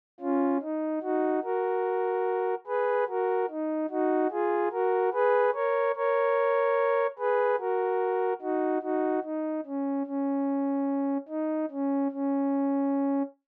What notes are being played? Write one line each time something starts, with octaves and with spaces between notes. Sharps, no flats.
C#4 F4
D#4
D#4 F#4
F#4 A#4
G#4 B4
F#4 A#4
D#4
D#4 F#4
F4 G#4
F#4 A#4
G#4 B4
A#4 C#5
A#4 C#5
G#4 B4
F#4 A#4
D#4 F#4
D#4 F#4
D#4
C#4
C#4
D#4
C#4
C#4